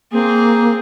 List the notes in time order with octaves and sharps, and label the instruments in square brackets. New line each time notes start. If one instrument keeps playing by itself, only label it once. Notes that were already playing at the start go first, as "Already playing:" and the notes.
[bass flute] A#3 [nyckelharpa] C4 G#4